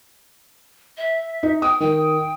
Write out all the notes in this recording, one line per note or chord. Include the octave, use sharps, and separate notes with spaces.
E5
D#4
G5 D#6
D#3 G5